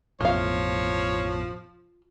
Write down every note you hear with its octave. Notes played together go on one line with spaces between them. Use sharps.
A1 F2 B2 F3 F4 C#5 F5